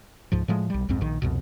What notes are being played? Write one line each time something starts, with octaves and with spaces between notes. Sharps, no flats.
C#2 G#2 F3
A2 F3 G#3
B1 G3
B1 F2 G#2 C4
A#1 D#3
C2 F2 B2